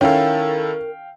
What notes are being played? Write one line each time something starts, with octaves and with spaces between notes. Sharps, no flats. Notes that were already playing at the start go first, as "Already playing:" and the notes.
D#3 C#4 E4 A4 A#4 F5 G5